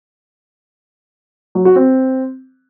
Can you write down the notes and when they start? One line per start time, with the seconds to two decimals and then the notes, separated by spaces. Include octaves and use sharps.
1.55 F#3
1.65 F#4
1.76 C4